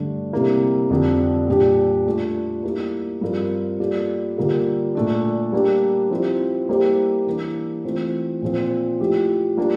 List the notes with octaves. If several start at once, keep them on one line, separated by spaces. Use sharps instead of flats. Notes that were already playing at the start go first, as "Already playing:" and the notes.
Already playing: G2 D3 A3 D4
C3 G3 A#3 E4
F2 D3 G3 D4
A#2 G3 D4 G4
A3 D4 F4
G3 A#3 E4
G2 F3 C4 F4 A#4
G3 A#3 F4 A4 D5
D3 G3 A#3 F4 A#4
A#2 A3 D4
G3 A#3 D4 G4
F3 C4 E4 G4
G3 A#3 E4 G4 C5
E3 A#3 D4
E3 A3 C4 F4
A#2 F3 C4
F3 A3 E4 G4
G3 A#3 D4 F4